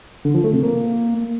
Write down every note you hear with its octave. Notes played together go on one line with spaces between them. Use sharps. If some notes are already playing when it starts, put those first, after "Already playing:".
D3
F3
A3
C3
A#3